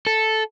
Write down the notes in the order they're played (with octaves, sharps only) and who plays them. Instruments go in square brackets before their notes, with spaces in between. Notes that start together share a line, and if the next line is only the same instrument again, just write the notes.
[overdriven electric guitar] A4